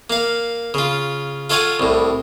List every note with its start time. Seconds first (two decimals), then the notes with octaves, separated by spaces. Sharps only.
0.10 A#3 F5
0.74 C#3 F4
1.50 F4 A4 C#5 F5 F#5 G#5
1.80 C2 A2